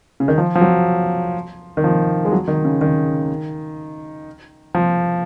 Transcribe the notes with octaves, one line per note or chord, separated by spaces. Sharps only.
C#3
D#3
F3
F3
F#3
D#3
F3
G#3
F#3
D#3
C#3
D#3
F3